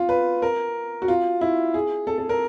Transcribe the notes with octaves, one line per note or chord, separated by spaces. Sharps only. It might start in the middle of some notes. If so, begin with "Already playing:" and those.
Already playing: F4
B4
A#4
F#4
F4
E4
G#4
A4
A4
A#4